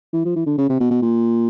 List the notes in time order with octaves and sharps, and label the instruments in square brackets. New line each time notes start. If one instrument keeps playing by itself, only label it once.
[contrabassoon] E3
F3
E3
D3
C#3
C3
B2
B2
A#2